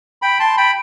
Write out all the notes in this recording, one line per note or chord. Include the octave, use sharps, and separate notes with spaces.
G5 B5
A5 C6
G5 B5